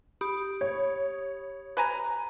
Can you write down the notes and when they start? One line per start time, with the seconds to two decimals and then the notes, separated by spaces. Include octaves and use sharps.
0.21 G4 B5 D#6
0.61 C#5
1.77 B4 G#5 A#5